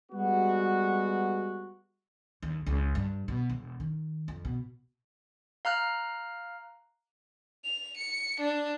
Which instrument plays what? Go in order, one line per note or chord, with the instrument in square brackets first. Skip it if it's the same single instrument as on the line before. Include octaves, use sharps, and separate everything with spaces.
[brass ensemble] G3 G#3 B3 F#4
[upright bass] D#2
C#2
G2
B2
E1
D#3
F2
B2
[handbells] F5 A#5 F6 F#6
[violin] F7
C#7
D4